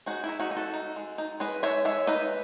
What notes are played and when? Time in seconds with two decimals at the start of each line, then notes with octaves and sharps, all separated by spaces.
0.06 G#3 D#4 F#4
0.24 E4
0.29 D#4
0.40 D#4 F#4
0.51 D#4
0.57 F#4 A4
0.73 D#4
0.96 G#3
1.18 D#4
1.40 G#3 B4 D#5
1.63 G#3 C#5 E5
1.85 G#3 C#5 E5
2.07 D#4 B4 D#5